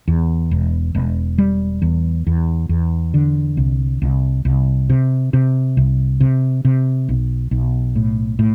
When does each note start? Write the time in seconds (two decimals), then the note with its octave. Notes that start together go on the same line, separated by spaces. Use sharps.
0.08 E2
0.51 E1
0.95 E1
1.38 G3
1.82 E2
2.27 E2
2.69 E2
3.14 D3
3.57 C2
4.02 C2
4.45 C2
4.90 C3
5.33 C3
5.77 C2
6.20 C3
6.65 C3
7.09 B1
7.51 B1
7.95 A2
8.39 A2